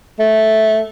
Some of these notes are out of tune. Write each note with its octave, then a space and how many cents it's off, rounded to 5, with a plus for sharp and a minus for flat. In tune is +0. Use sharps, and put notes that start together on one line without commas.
A3 -10